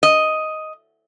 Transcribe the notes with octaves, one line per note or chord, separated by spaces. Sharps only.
D#5